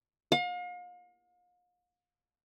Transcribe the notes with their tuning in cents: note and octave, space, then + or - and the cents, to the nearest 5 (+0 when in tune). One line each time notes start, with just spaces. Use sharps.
F5 +40